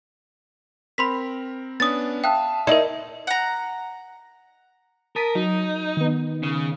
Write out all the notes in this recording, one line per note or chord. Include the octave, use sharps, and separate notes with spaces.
C4 A#4 B5 C6 B6
B3 C#4 D4 D#6 A6
E5 F5 G5 A5 D#6 F#6
D#4 E4 A#4 D5
F#5 A#5
A#4 A5 D#6 B6
F#3 D#4
D#3 B3
C#3